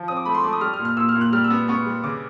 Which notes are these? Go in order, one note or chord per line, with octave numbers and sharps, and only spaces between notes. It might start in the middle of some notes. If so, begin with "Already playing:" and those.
Already playing: F3
C4 D#6
D6
A3 B5
C6
A3 D6
D#6
G3 F6
F6
A#2
F6
A#2 E6
F6
A#2
F#6
G3 F6
E6
B3
B3 C#6
G3
C#3 D6